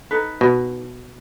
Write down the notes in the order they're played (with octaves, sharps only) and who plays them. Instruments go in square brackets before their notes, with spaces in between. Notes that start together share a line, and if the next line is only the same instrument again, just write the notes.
[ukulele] D#4 A4 B4
[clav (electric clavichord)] B2